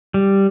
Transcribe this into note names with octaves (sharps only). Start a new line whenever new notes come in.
G3